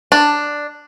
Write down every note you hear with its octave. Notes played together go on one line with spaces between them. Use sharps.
D4